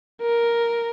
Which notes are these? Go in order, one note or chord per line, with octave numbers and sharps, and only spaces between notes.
A#4